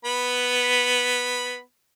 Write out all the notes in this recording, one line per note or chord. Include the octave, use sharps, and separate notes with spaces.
B3 B5